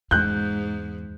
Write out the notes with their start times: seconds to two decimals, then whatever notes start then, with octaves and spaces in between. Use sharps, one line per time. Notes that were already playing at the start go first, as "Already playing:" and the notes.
0.11 E2 G#2 F#6 G6